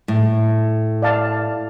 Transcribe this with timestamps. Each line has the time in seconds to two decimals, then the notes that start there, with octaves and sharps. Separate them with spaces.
0.08 A2
1.02 D5 F5 A5